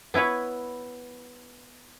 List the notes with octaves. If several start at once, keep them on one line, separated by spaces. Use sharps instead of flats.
B3 E4 B4 C#5